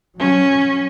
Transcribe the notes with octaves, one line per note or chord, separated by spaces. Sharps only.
F#3 C#4